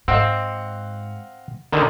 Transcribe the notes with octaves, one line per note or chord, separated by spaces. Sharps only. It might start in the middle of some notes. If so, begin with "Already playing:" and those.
G#2 C4 D#5 F5 F#5
D3 D#3 B3